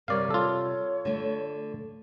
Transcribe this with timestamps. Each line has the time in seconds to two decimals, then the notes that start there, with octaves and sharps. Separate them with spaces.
0.08 C3 G3 A#4 C#5 D5 F5
0.30 F4 A4 C#5
1.05 D3 A3